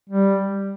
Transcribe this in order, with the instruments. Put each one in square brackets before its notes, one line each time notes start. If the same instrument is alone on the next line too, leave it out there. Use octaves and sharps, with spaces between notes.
[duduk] G3